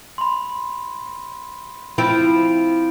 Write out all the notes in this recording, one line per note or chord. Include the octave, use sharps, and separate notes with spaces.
B5 C6
F3 C4 E4 B5 D7